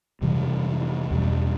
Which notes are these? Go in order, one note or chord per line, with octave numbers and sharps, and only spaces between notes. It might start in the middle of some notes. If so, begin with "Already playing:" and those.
F2 C3 E3 G3
E2 B2 G3